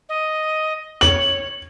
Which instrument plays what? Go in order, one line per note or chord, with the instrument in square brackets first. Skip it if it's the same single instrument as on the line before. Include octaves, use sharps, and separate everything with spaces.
[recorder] D#5
[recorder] C#5 [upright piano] F#7